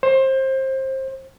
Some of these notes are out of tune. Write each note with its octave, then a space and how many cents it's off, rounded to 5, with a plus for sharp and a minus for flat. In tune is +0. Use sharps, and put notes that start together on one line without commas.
C5 +25